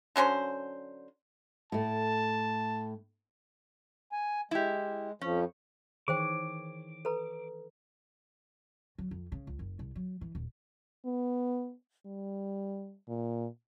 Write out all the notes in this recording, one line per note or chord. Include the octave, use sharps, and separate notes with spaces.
D3 F#3 C#4 C5
A2 A3 A5
G#5
G#3 E4 G4
F2 F3 C#4
D#3 E3 G#4 C5 C#5 G5 D6
A4 B4 A#5
F#3
F2
C#3
C#2
F#1
C2
F#3
E3
D#1
B3
G3
A#2